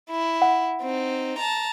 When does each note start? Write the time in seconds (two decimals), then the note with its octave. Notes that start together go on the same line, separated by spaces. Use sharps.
0.10 E4
0.42 F#5
0.82 C4 D#4
1.38 A5 A#5